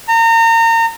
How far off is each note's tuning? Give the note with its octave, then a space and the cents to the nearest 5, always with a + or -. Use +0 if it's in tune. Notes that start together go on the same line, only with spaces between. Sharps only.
A#5 -35